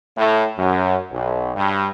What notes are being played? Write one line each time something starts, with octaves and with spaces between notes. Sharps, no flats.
A2
F#2
B1
G2